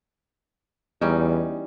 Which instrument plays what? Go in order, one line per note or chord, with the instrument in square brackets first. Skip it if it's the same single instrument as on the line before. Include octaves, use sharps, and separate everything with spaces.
[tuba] E2 [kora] G3 C#4 D#4